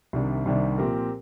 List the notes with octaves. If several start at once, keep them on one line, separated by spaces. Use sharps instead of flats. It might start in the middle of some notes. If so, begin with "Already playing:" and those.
C2 C3 D#3 G3 D4
C2 C3 D#3 G3 D4
A#2 F3 C4 G4 A#4